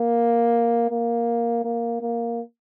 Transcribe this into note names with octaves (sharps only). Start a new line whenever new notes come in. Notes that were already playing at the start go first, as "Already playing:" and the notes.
Already playing: A#3
A#3
A#3
A#3